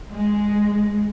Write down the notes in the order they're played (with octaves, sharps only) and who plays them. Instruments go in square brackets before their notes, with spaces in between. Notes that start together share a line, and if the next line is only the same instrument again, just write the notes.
[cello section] G#3